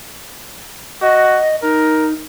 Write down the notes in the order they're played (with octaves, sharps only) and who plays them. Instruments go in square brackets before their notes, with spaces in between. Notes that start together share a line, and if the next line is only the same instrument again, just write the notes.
[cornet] F#4 [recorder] D#5
[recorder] D#4 [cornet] A#4